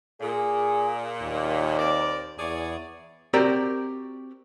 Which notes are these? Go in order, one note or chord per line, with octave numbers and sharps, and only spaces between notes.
A#2 G#4
D#2
C4 A#4 D5
E2 G#4 C#5 D5
C4 F#4 G4 A#4 C5 D5